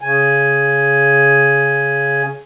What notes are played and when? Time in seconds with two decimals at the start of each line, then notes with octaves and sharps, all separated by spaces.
0.01 C#3 G#5